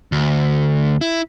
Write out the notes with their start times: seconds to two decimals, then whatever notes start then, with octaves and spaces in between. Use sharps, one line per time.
0.12 D2
1.01 E4